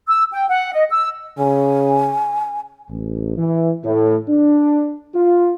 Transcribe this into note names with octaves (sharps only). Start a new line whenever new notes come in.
E6
G5
F#5
D#5
E6
C#3 G#5
A1
E3
A2
D4
F4